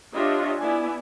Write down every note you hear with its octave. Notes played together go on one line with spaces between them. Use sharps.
D4 F4 G4 C#5 D#5 E5
B3 E4 D5 G#5